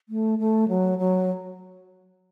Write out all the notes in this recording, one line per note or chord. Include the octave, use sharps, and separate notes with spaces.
A3
A3
F#3
F#3